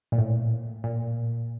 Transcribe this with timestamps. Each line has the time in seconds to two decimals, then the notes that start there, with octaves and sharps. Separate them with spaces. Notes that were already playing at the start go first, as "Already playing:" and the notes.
0.12 A#2
0.18 A2
0.84 A#2